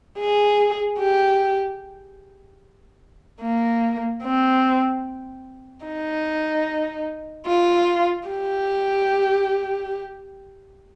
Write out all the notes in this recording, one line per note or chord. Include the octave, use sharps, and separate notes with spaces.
G#4
G4
A#3
C4
D#4
F4
G4